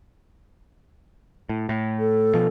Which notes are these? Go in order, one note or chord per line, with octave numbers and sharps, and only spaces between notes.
A2
A2
A4
B2 F3